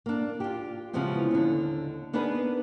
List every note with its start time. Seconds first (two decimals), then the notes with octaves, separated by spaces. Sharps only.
0.06 A#3 D4
0.40 F4 G4
0.93 C#3 E3 F3 G#3 B3 C4
1.31 D#2 D3
2.13 B3 D4 D#4 G#4 A#4 B4